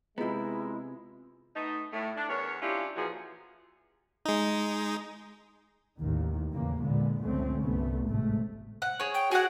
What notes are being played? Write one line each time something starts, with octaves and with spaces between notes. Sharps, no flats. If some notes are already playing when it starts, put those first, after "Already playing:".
C3 G#3 B3 E4 F4 G#4 A#5
A3 B3 D#4
A2 A3
D4
E2 A#4 C#5
C#4 D4 E4 F4 G4
A#2 E3 F3 F#4 G#4
G#3 D#4
A1 D#2 D#3
E2 A2 C#3 A#3
A#2 D3 G#3 B3
C#2 F#2 D3 A3 C4 C#4
C2 G2 A3 B3
G#1 A2 C3 G#3 A3
F#5
G#4 C#5
G5
F#4 G#4 F#5